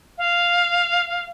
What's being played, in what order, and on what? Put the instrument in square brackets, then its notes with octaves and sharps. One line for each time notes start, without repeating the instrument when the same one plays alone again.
[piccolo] F5